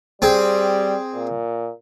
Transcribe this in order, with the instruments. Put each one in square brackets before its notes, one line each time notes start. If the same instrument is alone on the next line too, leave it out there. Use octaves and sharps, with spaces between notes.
[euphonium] G3 [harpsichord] C4 G#4
[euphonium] A#2